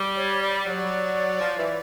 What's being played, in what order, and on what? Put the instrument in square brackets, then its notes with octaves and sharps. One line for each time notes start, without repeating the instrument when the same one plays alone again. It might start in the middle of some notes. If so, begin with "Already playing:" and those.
Already playing: [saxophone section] G3
[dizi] C#5
D5
[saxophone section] F#3
F3
E3